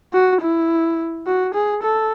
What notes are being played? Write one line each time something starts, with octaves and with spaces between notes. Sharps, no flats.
F#4
E4
F#4
G#4
A4